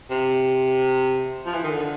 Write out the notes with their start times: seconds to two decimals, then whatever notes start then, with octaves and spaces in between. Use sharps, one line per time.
0.10 C3
1.46 F3
1.54 E3
1.63 D#3
1.71 D3